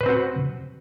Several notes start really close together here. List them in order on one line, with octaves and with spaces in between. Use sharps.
B4 C5 C4 F#4